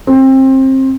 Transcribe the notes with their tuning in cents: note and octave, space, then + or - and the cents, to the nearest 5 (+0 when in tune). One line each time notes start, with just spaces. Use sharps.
C4 +25